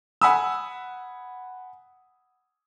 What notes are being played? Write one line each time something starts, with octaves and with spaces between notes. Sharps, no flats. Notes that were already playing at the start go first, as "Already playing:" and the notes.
F#5 G#5 B5 D#6 E6